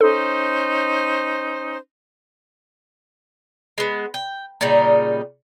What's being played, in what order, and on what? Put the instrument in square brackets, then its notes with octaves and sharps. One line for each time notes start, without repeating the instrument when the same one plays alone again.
[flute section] C#4 D#4 C5 [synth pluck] A4
[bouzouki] G#3 B3
G5
A#2 C#3 G3 D#4